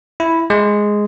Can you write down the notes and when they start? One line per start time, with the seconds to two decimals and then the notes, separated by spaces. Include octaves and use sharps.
0.20 E4
0.50 G#3